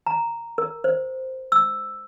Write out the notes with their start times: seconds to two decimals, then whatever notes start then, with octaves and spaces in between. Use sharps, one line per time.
0.07 A#5
0.58 A#4
0.84 C5
1.52 E6